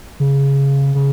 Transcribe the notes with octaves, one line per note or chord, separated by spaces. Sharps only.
C#3
C#3